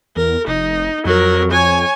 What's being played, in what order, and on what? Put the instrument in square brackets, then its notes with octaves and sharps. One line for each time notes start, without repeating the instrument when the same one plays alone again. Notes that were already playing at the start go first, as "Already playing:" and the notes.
[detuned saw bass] E2 [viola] A#4
[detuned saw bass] F1 [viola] D#4
[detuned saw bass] F2 [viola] F#3 A#4
[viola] C#5 G#5